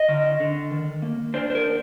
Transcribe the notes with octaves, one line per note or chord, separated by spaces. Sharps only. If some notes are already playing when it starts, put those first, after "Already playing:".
Already playing: D#5
D3
D3
D#3
A#3
D4 C5
C5
A#4